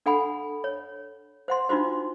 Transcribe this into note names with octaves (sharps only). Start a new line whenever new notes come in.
D4 A4 F#5 G#5 B5
C#5
C5 F#5 C6
D4 D#4 F4 F#4 C5